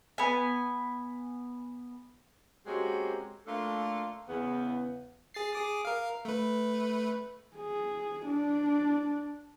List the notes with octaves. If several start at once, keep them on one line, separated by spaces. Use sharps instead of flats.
B3 G#5
G#3 A#3 C4 C#4 F#4 G4
A3 A#3 D4 F4 A4
E2 C#3 B3
G#4 A6 C7
G#4 D6 D#6
A#4 F5
A3 B4
G#4
D4